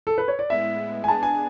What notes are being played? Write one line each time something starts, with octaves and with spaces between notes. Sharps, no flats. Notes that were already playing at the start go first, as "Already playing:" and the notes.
A4
B4
C#5
D5
A2 G#3 B3 E4 E5
G#5
B3 D4 G#4 A5
G#5